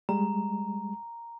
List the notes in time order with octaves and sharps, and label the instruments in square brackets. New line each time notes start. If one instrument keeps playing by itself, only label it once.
[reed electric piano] G3 G#3 [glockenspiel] A#5